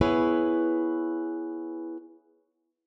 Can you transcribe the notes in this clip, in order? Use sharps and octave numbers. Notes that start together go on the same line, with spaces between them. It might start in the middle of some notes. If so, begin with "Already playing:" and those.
B3 E4 G#4 B4 C#5